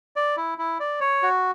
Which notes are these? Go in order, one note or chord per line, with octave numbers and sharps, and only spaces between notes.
D5
E4
E4
D5
C#5
F#4